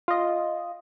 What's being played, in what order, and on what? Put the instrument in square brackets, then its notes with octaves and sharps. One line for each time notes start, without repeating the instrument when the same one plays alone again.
[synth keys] F4 D#5